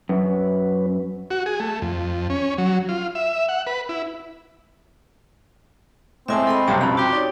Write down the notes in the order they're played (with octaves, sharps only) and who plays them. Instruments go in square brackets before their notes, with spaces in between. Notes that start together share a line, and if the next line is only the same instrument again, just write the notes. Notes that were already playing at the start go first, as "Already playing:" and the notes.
[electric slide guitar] F#2 [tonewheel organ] C#4 B4
[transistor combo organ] F#4
G#4
A3
F2
C#4
F#3
F4
E5
F#5
B4
E4
[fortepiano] A2 G#3 [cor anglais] C4 [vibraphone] E5 G#5 A5
[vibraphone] A4 D#5 B5
[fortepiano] B1 G2 C3 [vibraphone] A#5
[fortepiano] F2 [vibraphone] C#4 B5
[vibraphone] F#4 C6 [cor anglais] G4
[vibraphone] D#4 C#5 [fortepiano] D5